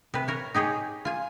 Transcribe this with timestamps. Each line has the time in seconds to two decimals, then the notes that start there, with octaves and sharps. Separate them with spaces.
0.14 C3 B4
0.28 A#4 C#5
0.54 D#4 G4 G#4 C#5
1.05 F4 G#5